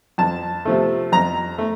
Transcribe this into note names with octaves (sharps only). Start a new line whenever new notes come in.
F2 A5
C3 F3 A3
F2 A#5
A3